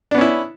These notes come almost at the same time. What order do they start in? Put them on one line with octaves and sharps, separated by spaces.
D4 B3 C#4 E4